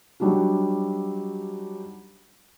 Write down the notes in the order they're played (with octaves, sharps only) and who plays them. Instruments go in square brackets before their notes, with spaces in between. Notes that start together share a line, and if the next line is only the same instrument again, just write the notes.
[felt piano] F#3 G3 D4 D#4 F#4